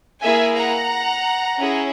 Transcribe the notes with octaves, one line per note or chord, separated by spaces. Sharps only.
A#3 E4 G#4 E5 G#5
F#5 A#5
C#4 E4 G#4